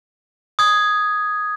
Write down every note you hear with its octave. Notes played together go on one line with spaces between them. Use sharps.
D#6 G#6